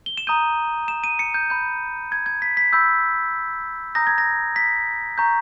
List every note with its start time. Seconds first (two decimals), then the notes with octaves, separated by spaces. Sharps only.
0.06 G7
0.17 E7
0.27 A#5 D#6 G6 D#7
0.88 E7
1.04 D#7
1.19 C#7
1.34 G6
1.50 B5 G6
2.12 G#6
2.26 G#6
2.42 B6
2.57 B6
2.73 B5 E6 G6
3.95 A#5 D#6 G6 A#6
4.07 G#6
4.18 A#6
4.56 B6
5.18 A#5 C#6 G6